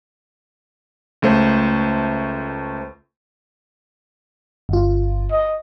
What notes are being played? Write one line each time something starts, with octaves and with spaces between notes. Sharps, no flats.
C#2 A3 C5
G1 F4
D#5